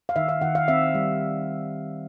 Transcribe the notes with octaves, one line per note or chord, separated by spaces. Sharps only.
F5
D#3 E5
F5
D#3 F#5
F5
C4 E5
G3